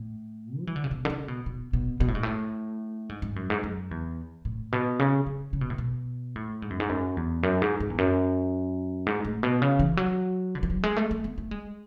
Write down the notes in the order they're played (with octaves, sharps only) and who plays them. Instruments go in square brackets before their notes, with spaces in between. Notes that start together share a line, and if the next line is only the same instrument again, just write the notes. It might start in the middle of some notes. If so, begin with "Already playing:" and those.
Already playing: [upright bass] A2
F#3
E3
D3
C#3
B2
D3
C#3
B2
B2
B2
B2
A2
G#2
A2
G#2
G#2
F#2
G#2
F#2
E2
A2
B2
C#3
C#3
C#3
B2
A2
B2
A2
G#2
F#2
G#2
F#2
E2
F#2
G#2
G#2
E2
F#2
G#2
A2
B2
C#3
E3
F#3
D3
E3
F#3
G#3
A3
A3
B3
A3
G#3